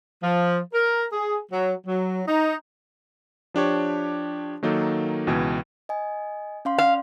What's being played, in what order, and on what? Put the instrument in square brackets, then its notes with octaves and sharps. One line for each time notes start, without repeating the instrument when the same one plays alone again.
[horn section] F3
A#4
G#4
F#3
F#3
D#4
[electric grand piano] F3 D4 G4 C#5
D#3 F#3 A#3 D#4 A4
C#2 B2 E3 G#6
[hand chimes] D#5 G#5
C#4 F5 C6
[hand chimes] D5 [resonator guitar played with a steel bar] F5